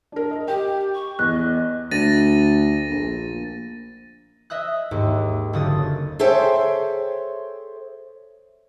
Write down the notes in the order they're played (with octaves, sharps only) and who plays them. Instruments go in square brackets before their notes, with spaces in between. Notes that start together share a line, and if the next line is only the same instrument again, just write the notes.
[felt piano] D4 A#4
D#5
[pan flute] G4 [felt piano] G5
[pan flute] C#6
[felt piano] E2 [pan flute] D#5 [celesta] F#6
[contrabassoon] D2 [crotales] A6 A#6 D#7
[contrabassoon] A#1
[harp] D#5 E5 D#6 F#6
D#2 G#2
F#1 D3 D#6 A6
[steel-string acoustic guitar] G#4 A4 C5 C#5 E5 G5